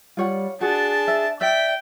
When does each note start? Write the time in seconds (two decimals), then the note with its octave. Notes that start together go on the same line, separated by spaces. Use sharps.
0.17 G3 F4 C#5 F#5
0.61 D4 F#4 G#4 A5
1.08 E5
1.41 D5 E5 G5 B6